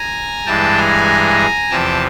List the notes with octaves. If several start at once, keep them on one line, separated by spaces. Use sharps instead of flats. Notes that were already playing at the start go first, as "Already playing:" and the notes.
Already playing: G#5 A#5
G2 E3 G#3 G5 A5
G#5 A#5
E2 C3 F3 G5 A5